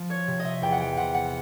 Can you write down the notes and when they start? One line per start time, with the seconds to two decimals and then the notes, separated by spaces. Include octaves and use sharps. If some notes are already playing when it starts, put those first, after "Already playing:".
Already playing: F3
0.10 C#5
0.27 C3
0.40 D#5
0.45 E5
0.62 E2 G5
0.72 F#5
0.80 G5
0.97 C3 F#5
1.14 F#5